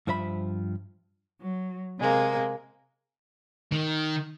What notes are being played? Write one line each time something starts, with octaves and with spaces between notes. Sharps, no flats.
G2 F3 C5 E5 B5
F#3
C3 G#3 A#3
D#3